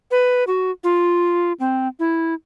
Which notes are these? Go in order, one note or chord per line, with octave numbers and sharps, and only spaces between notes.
B4
F#4
F4
C4
E4